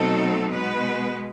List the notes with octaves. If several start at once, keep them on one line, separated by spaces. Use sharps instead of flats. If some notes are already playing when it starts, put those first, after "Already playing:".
Already playing: B2 F#3 A3 C4 D#4 A4
B2 G#3 B3 B4